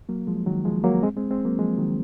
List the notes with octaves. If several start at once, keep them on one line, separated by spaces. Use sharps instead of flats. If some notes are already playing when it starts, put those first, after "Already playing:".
F#3 A#3
F3 G#3
D#3 F#3
F3 G#3
F#3 A#3
G#3 C4
G#3 C4
G#3 C4
F#3 A#3
F3 G#3
D#3 F#3